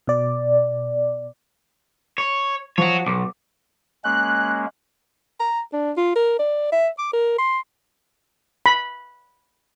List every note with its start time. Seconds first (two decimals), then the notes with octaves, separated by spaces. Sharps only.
0.07 B2 D5
2.18 C#5
2.78 F3 F#4 C#5
3.06 B1 D6
4.04 G#3 A#3 C#4 F#6
5.40 A#5
5.73 D4
5.97 F4
6.16 A#4
6.39 D5
6.72 E5
6.98 D6
7.13 A#4
7.38 C6
8.66 B5